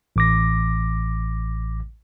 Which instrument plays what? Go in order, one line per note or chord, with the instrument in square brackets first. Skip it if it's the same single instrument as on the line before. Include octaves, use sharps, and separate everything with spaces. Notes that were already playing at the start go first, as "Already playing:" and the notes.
[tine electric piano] A1 D6 A#6